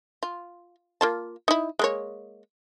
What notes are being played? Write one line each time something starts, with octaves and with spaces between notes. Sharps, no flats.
F4
A#3 F4 A5
D#4 E4
G#3 A#3 C#5